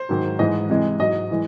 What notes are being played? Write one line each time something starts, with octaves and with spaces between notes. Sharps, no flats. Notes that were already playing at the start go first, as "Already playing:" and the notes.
Already playing: C5
G#2 D#3 F#3
G#2 E3 G#3 D#5
C3 E3 G#3
G#2 F#3 D#5
E3 G#3